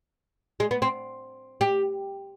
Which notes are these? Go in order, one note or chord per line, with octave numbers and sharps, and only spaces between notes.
G#3
B3
C4
G4